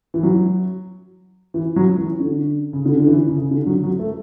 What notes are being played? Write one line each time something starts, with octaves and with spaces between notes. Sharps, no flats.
E3
F#3
E3
F#3
E3
D3
C#3
D3
D3
E3
C#3
C#3
D3
F#3
F#3
A3